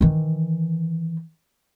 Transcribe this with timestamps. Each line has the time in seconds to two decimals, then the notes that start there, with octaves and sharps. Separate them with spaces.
0.01 D#3 E3